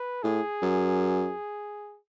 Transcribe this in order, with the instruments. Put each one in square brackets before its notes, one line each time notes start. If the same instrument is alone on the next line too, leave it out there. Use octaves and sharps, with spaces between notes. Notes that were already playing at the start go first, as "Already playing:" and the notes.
Already playing: [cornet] B4
[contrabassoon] A2 [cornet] G#4
[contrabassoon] F#2